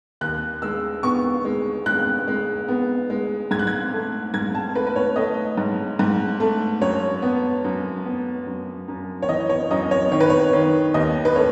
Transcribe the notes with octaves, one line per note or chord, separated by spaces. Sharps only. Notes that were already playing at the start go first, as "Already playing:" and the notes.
D#2 F#6
G#3 E6
B3 C#6
G#3
G#3 F#6
G#3
B3
G#3
G#2 G#6
F#6
G#6
A3
G#2 G#6
A5
A3 B4
B4
C#5
A3 D#5
G#2
G#2
A3
F#2 C#5
B3
F#2
B3
F#2
F#2
C#5
E3 D#5
C#5
F#2 D#5
C#5
D#3 C#5
B4
C#5
D#3
D#2 D#5
B4
A3 C#5